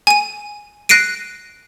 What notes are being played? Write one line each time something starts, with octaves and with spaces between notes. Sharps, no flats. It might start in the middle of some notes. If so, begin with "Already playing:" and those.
G#5 D#7
F#6 A#6 C7 D7 D#7